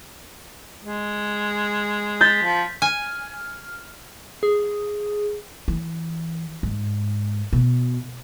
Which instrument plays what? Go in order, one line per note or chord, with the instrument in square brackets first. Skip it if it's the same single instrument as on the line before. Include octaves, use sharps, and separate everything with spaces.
[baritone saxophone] G#3
[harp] G6 A6 B6
[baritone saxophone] F3
[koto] G#5 [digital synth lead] F6
[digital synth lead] G#4
[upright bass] E3
G#2
B2